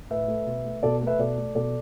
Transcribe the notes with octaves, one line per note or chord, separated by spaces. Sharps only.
A2 B4 E5
A3
B2
A3
B2 A4 D5
A3
B4 E5
B2 A4 D5
A3
B2 A4 D5